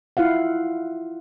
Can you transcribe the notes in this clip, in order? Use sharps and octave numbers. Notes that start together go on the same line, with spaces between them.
E4 F4 F5 F#5